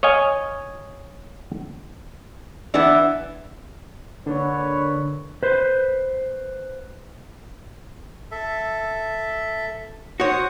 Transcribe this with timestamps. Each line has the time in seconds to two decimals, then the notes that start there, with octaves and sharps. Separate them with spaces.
0.03 C#5 D#5 F5 G#5
2.74 E3 B3 D4
4.26 D3 A#3 B4 C#5
5.43 B4 C5
8.31 A4 E5
10.20 F#4 C5 C#5 F#5 D#6